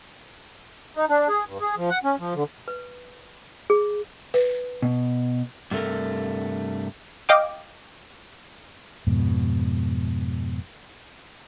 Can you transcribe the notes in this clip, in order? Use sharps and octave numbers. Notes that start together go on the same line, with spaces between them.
D#4
D4
G#4
G2
G#4
F3
F#5
C#4
F3
D3
B4
G#4
B4
B2
G2 C3 A3 A4 A#4
D#5 F5 G5 D6
F2 G#2 B2